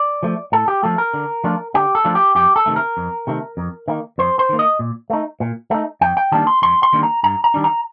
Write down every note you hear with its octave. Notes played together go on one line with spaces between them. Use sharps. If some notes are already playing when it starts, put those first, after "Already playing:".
Already playing: D5
F3 A3
A2 A4
G4
F3 A3 A4
A#4
D3
F3 A3 D4 F4
D3 G4
A4
F3 A3 D4 F4
G4
F2 G4
A4
C3 D#3 A3
A#4
F2
C3 D#3 A3
F2
D#3 A#3
F2 C5
C5
D#3 A#3
D#5
A#2
A3 D#4
A#2
A3 D#4
F2 G5
G5
D#3 G3 A#3 D4 A5
C6
F2 C6
C6
D#3 G3 A#3 D4
A#5
G2 A#5
A#5
D#3 G3 D4
A#5